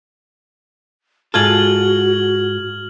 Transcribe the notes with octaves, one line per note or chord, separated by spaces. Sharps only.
G#2 F4 F#4 A4 F6 G#6 F#7